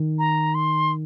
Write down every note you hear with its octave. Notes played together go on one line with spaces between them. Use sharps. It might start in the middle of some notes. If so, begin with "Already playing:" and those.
Already playing: D#3
A#5
C6